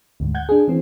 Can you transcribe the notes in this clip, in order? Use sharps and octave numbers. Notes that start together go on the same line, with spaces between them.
D2 G#2
F#5 G6 G#6
D4 G#4
E3 C4